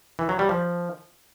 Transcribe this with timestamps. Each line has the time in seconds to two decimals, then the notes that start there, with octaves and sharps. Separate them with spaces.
0.19 E3
0.29 F#3
0.39 G3
0.49 F3